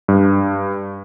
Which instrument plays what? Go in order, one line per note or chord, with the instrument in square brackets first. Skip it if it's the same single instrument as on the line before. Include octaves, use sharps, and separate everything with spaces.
[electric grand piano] G2